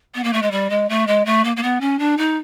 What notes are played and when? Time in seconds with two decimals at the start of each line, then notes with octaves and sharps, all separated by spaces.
0.14 B3
0.23 A#3
0.33 A3
0.42 G#3
0.51 G3
0.70 G#3
0.89 A3
1.07 G#3
1.25 A3
1.44 A#3
1.56 A#3
1.63 B3
1.80 C#4
1.99 D4
2.17 D#4